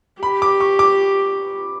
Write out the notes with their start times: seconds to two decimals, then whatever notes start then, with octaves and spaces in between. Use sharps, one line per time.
0.22 G4 B5
0.42 D6
0.60 C#6
0.79 D6